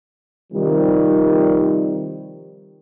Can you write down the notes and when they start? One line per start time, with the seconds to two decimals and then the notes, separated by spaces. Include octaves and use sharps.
0.53 C3 D#3 F3 G3